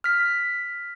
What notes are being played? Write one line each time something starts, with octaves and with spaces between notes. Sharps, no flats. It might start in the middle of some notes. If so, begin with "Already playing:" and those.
F6 B6